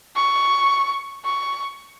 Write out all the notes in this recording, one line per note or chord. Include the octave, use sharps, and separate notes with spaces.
C#6
C#6